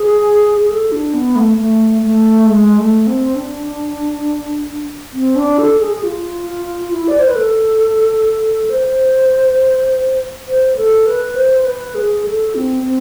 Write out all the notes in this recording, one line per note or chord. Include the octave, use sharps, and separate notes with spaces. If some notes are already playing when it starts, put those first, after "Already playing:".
Already playing: G#4
G#4
A4
D4
B3
A3
A3
A3
G#3
A3
C4
D4
C4
D4
A4
G#4
G#4
F4
E4
D5
C5
B4
A4
C5
C5
A4
B4
C5
B4
G#4
A4
C4
C4